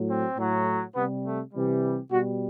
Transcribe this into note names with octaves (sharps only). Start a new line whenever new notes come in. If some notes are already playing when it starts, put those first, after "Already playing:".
Already playing: A2 F#3
C4
A2 F#3
C3 G3 B3
A3
C3 E3 G3
B2 G3 F#4